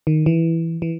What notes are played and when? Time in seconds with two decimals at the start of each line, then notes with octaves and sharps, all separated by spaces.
0.07 D#3
0.26 E3
0.82 E3